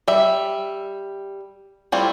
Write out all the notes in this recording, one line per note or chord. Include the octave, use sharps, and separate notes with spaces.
G3 E5
G3 A3 C4 E4 F4